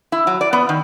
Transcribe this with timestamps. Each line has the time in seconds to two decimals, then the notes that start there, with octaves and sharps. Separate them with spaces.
0.12 E4
0.27 F#3
0.41 D5
0.53 B3
0.69 D#3